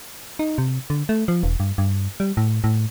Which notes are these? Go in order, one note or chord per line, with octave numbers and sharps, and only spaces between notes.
D#4
C3
D3
A3
F3
E1
G2
G2
G3
A2
A2